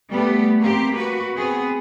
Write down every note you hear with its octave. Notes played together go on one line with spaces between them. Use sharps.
G3 A3 B3 G4
A#3 C4 G4
F#4 B4
B3 C4 G#4